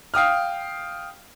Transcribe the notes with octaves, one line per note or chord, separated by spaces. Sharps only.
F5 G5 D#6 F6